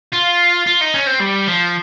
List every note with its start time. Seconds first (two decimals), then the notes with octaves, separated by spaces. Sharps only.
0.13 F4
0.67 F4
0.81 D#4
0.94 C#4
1.07 C4
1.20 G3
1.48 F3